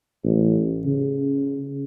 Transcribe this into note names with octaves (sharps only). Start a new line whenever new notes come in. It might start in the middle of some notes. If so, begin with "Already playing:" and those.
A1
C#3